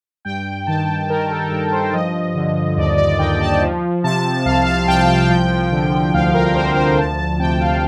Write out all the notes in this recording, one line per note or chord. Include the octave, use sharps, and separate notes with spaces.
G2 G5
D#3 A5
D#3 A#4
A4
G2 A#4
C5
F3 D#5
D3
D#2 D5
D5
D#2 G5
A5
F3
C3 A5
C2 F5
F5
C2 G5
A5
F3 G5
D3
D2 F5
A#4
D2 C5
C5
F3 A5
A5
C3 G5
F5